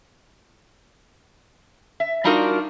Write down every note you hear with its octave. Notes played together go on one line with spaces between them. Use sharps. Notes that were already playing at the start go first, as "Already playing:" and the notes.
E5
G3 D4 D#4 F4 F#4 A#4